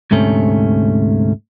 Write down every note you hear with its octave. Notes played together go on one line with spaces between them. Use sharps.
D2 G#2 C3 A3 C#4